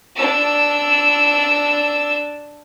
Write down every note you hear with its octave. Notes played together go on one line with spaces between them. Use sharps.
D4 E6